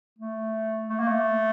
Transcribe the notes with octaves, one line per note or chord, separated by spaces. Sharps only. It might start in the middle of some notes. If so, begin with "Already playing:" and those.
A3
A3
A#3
A3